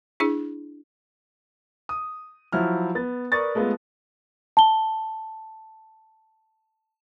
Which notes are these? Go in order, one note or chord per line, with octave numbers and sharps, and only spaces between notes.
D4 E4 G#4
D#6
F3 F#3 E4 F6
B3 A6
A#4 B4 D5 C#6 D#6 A6
G#3 A3 B3 F4
A5 G7